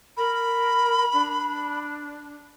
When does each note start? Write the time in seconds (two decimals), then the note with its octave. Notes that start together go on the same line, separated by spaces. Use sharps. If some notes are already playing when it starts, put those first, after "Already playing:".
0.17 A#4 B5
1.12 D4